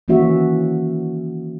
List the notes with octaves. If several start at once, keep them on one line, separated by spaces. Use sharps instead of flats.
D#3 E3 A#3 C#4 F#4 E5